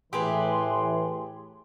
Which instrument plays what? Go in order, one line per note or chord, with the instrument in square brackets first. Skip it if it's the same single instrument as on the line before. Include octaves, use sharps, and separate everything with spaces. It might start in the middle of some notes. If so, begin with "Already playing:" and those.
[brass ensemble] A2 E3 [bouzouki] G4 G#4 B4 [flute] C6